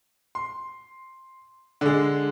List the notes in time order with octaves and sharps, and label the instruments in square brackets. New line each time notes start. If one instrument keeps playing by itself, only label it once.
[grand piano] C6
D3 G#3